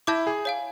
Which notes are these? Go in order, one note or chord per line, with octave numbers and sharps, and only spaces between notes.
E4 E5 A5 D6 G6
G#4
C#5 F5 G#5